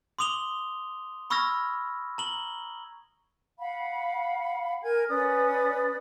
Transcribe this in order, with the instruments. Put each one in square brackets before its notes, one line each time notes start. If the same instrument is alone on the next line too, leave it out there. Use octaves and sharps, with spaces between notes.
[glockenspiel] C6 D6 D#6 F7 G7
B5 C#6 E6 F6 G#6 A#6
A#5 F#7 G7
[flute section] F5 F#5 B5
A#4 G#5 G#6
C#4 B4 D5 D#6